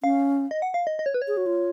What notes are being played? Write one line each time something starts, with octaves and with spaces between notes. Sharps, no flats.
C#4 F5
D#5
F#5
F5
D#5
D#5
C#5
B4
C#5
G#4
F#4
F4